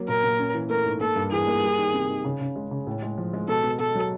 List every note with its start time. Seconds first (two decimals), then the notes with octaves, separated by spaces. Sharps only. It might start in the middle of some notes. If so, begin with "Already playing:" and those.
Already playing: F#3 A#3
0.08 A#2 A#4
0.24 A#2
0.39 C#4
0.55 E3
0.70 A3 A#4
0.85 G#2
1.01 A#3 A4
1.16 G2
1.32 E3 G#4
1.47 A#3
1.62 G3
1.78 D#3
1.94 C3
2.09 D#3
2.25 C#3
2.41 C#3
2.56 G#3
2.71 C#3
2.87 A2
3.02 G#3
3.18 F3
3.33 G#3
3.48 B2 A4
3.64 B2
3.80 B2 A4
3.95 F#3